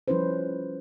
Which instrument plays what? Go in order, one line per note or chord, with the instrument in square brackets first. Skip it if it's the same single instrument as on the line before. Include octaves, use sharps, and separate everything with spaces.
[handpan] F3 G3 C#4 E4 B4 C5